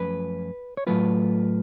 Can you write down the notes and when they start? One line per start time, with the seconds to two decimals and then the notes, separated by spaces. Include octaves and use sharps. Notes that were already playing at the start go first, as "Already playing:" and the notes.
Already playing: F#2 F3 A3 C#4 F4 B4
0.77 C#5
0.87 A2 F#3 A3 F4 B4